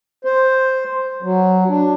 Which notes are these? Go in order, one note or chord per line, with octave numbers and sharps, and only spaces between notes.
C5
F#3
D4